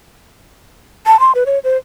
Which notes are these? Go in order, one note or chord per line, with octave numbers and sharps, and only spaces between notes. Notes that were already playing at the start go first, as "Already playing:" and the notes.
A5
C6
B4
C#5
C5